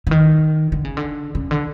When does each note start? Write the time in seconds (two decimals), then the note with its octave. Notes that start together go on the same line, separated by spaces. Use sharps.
0.07 D3
0.11 D#3
0.72 D3
0.85 C#3
0.97 D3
1.35 C#3
1.51 D3